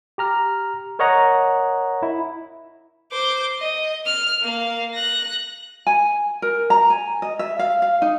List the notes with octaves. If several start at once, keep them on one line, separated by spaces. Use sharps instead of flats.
G4 A#5 F6
A#4 C#5 D#5 F#5 A#5
E4
C5 D6
D#5
F6
A#3 F5
F#6 A#6
G#5
A#4
A#5
G#5
D#5
E5
F5
F5
D#4